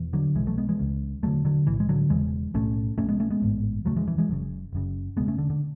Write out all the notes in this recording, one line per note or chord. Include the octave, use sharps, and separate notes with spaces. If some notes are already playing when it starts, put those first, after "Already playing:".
Already playing: E1 E2
D3 F#3
B1 B2 E3 G#3
F#3 A3
G#3 B3
E3 G#3
C#2 C#3
E1 D2 D3 F#3 A3
D3 F#3
B1 A2 E3
G#3
D3 F#3
E1 E2 C#3 E3 G#3
B1 A2 A3 C#4
B1 A2 A3 C#4
G#3 B3
A3 C#4
G#3 B3
A1 G#2
E1 D2 C#3 F#3 A3
E3 G#3
E3
E3 G#3
F#1 F#2 C#3
F#1 F#2 C#3
E1 D2 C#3 G#3 B3
A3 C#4
D3
D3